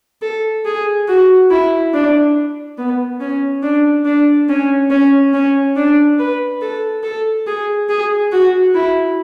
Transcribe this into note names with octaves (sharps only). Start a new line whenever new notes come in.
A4
G#4
F#4
E4
D4
B3
C#4
D4
D4
C#4
C#4
C#4
D4
B4
A4
A4
G#4
G#4
F#4
E4